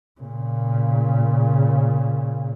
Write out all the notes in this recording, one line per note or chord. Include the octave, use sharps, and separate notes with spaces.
A#2 C#3